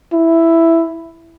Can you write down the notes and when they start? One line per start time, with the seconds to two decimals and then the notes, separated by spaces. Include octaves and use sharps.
0.13 E4